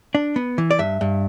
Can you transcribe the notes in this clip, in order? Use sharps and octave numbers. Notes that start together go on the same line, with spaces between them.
D4
B3
E3
D5
G2 E5
G2